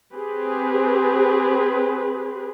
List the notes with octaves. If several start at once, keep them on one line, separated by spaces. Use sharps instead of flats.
C4 G4 G#4 B4